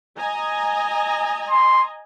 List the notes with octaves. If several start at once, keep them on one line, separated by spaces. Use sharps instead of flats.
D#5 G#5 A#5
C6